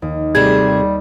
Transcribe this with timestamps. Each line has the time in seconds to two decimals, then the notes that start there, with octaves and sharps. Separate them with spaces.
0.02 D#2
0.35 C3 G3 A3 G#4 G#6